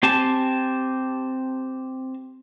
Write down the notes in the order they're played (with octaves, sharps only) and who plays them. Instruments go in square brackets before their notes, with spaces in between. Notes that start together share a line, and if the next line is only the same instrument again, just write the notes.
[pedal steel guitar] C4 G4 G#5 A5